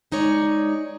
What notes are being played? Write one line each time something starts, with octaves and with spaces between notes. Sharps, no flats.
G#3 D#4 G#4 C#5 D5